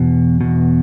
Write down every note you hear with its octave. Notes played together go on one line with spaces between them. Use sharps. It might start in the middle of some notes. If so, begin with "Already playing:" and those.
Already playing: E2 B2
E2 B2